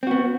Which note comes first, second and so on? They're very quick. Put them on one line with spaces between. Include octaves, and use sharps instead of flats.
C4 F#4 B3